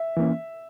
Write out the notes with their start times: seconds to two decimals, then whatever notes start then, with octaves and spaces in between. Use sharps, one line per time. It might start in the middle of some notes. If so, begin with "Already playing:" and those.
Already playing: E5
0.17 E3 A#3 C#4